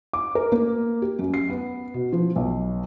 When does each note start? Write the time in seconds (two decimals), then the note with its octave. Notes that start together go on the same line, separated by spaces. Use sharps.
0.13 D6
0.35 A#4
0.52 A#3
1.02 G4
1.19 F#2
1.34 C7
1.50 B3
1.94 B2
2.12 F3
2.36 B1